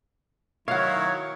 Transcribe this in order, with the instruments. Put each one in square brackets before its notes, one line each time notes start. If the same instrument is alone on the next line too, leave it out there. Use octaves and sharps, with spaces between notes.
[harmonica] D#3 F#3 E4 [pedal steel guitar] C#5 [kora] F5 F#5